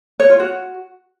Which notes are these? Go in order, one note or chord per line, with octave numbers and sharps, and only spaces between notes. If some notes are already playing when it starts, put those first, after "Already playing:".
C#5
F4
F#4